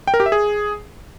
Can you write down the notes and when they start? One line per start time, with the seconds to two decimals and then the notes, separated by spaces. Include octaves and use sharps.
0.07 G5
0.14 A#4
0.20 G4
0.26 E5
0.32 G#4